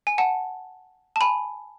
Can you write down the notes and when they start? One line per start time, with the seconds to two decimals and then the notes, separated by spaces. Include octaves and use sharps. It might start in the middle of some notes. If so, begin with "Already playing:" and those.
0.07 G#5
0.18 F#5 A5
1.16 A5
1.21 G#5 B5